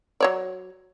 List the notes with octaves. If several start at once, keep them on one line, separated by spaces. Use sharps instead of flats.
F#3 C#5 D5